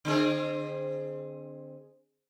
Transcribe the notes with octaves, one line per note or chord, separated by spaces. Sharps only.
D3 C4 G#4